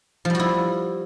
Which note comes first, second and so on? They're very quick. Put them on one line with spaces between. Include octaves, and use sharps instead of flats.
F3 G3 F#4 E4